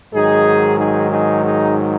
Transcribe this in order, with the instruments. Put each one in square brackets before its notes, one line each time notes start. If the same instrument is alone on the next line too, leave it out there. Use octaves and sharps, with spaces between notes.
[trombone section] G#2 D#3 F#3 D#4 G#4
D#4 G#4
D#4 G#4
D#4 G#4